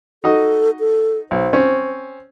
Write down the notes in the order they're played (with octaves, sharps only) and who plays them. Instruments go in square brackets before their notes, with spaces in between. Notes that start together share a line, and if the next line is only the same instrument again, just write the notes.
[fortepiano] D#4 F#4 D#5 [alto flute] A4
[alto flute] A4
[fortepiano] B1 [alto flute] C5
[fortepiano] C4 C#4 C#6